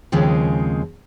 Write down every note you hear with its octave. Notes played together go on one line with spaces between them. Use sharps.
D#2 C#3 F3 G#3 C4